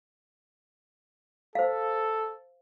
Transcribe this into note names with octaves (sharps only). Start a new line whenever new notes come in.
A4 C5 F5